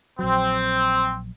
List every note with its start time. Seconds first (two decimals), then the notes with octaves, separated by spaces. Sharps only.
0.19 A#1 F#3 C4